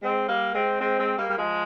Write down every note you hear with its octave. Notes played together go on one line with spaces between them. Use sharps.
G#3 C4
G3 A#3
G#3 C4
G#3 C4
G#3 C4
G3 A#3
G3
F3 G#3